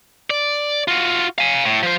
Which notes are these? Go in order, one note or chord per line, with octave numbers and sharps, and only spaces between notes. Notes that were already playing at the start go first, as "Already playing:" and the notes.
D5
F4 F#4
F5 G#5
A2
F3 C5